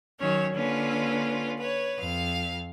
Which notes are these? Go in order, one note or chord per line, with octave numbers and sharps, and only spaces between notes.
D#3 F#3 C#4 C#5
D3 A#3 C#4 F4 B4
B4 C#5
F2 F5